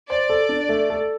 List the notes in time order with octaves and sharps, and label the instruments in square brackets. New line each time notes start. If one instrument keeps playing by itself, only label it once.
[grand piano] C5 [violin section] D5
[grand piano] A4
D4
A3
A4